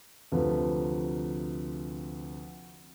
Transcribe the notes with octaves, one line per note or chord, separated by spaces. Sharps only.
D2 C3 F3 B4